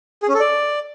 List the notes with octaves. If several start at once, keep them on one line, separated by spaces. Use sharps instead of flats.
G#4
C#4
A4
D5